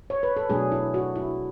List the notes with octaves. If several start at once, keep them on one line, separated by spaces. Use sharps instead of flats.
C#5
B4
A4
B2 F#3 A3 D4 G#4
E4
F#4
E4